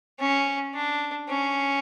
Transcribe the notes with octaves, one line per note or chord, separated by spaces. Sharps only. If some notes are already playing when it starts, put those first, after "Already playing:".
C#4
D4
C#4